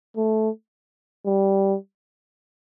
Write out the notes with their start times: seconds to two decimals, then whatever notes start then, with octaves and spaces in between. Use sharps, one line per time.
0.17 A3
1.26 G3